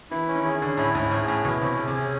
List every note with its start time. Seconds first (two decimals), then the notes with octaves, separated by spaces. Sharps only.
0.11 E3 E4
0.28 C#4
0.35 D#3
0.44 G#4
0.61 D3 C#4
0.78 A2 E4
0.94 G#2 C#4
1.11 A2 G#4
1.28 A2 C#4
1.45 B2 E4
1.61 C3 C#4
1.79 G#4
1.87 C3
1.95 C#4